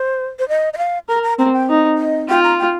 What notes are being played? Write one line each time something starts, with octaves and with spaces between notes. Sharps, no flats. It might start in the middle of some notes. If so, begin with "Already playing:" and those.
Already playing: C5
C5
D#5
D#5
F5
A#4 A#5
A#5
C4 A#5
G5
D#4
D#5
F4 G5
A#5
G5